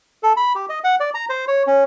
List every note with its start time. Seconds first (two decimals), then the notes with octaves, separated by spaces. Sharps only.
0.23 A4
0.37 B5
0.55 G4
0.69 D#5
0.84 F#5
1.00 D5
1.14 A#5
1.30 C5
1.47 C#5
1.67 C#4